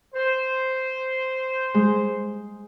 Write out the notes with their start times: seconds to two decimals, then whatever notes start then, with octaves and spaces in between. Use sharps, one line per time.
0.15 C5
1.74 G#3